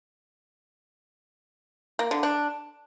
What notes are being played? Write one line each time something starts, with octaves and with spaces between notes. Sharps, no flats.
A#3
D3
D4